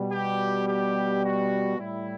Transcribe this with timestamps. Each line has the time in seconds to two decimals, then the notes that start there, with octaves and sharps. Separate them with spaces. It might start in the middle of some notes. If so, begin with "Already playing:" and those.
Already playing: B2 G3
0.10 G4
0.66 G4
1.23 F#4
1.78 A2 G3 E4